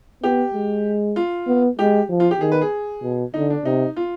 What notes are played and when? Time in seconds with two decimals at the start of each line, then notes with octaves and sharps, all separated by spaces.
0.23 B3 G4
0.54 G#3
1.16 F4
1.47 B3
1.79 G#3 G4
2.09 F3
2.20 F4
2.31 G4
2.40 D#3 G#4
2.52 B4
2.61 G#4
3.03 B2
3.34 D3 D#4
3.50 D4
3.65 C3 D#4
3.96 F4